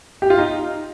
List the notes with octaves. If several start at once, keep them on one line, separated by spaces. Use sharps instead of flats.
G4
F4
D#4